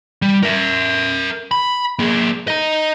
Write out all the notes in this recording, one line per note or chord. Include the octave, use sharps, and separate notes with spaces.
G3
A#4 E5
B5
A#3 G#4
D#5 A#5